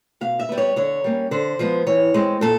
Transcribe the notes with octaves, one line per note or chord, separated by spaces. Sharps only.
B2 F5
E5
G3 B3
C#5
D3 C#5
G3 A#3 C#4
D3 C5
F3 G#3 B3
E3 C#5
G#3 C4
A#2 A4